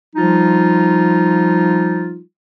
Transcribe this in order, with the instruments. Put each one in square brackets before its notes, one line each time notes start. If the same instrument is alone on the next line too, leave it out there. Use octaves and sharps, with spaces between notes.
[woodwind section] F3 G3 D#4 F4